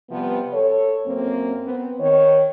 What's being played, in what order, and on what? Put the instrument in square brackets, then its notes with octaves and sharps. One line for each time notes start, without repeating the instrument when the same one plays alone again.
[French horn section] C3 F3 G3 B3
A4 C#5
F#2 A#3 C4
B3 C4
D#3 C#5